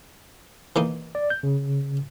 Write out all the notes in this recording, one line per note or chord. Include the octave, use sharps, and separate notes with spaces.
E3 A#3 D#4
D5
G6
C#3